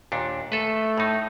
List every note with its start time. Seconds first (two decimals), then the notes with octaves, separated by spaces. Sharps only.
0.12 D#2 A#2 D4
0.52 A3 A4 B4
0.97 A2 D#4